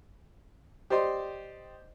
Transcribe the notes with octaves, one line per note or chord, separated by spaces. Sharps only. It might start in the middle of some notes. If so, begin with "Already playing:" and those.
G4 C5 D5 D#5 C6